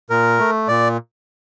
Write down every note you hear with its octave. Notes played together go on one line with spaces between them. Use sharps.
A#2 A#4
A3
A#2 D5